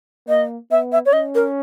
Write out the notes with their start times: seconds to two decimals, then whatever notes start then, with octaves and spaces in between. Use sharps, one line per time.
0.28 A#3 D#5
0.71 B3 E5
0.92 E5
1.06 C#5
1.13 C#4 D#5
1.35 A#4